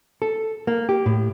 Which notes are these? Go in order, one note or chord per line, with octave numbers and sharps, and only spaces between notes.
A4
A#3
G4
A2